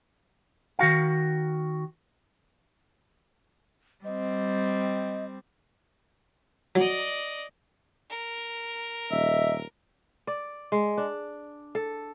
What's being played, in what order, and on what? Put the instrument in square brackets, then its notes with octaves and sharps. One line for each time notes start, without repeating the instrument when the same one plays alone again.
[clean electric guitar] D#3 F#4 F5
[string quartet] G3 C4 [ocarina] D#5
[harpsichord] F#3 [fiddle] D5 D#5
[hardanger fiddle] A#4
[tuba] D#1 [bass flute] D#5 [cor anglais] E5
[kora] D5
G#3
D4
A4